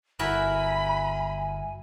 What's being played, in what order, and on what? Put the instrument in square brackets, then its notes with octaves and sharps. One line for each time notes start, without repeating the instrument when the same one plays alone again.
[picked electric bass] G1 [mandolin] E4 F#4 A#4 [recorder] G#5 [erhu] B5